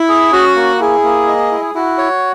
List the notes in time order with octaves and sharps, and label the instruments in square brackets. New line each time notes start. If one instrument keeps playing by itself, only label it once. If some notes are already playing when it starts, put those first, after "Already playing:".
Already playing: [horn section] E4
[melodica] G#4
[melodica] C#4 [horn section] F#4
[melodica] A#3
[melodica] E4 [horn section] G#4
[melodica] A#3
D#5
E4
[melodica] E4 [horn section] F#4
[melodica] C#5